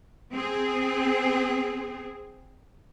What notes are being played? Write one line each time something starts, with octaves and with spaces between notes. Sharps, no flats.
C4 G#4